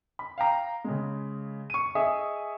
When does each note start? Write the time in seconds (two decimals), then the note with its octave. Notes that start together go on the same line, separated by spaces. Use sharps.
0.19 B5
0.38 F5 G5 A#5
0.84 C#3 G#3
1.70 C#6 D#7
1.95 G#4 D#5 E5 G#5 C#6 D#6